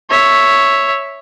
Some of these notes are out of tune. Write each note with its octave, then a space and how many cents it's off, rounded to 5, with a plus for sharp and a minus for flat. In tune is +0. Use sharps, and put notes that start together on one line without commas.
C#5 +0 E5 +0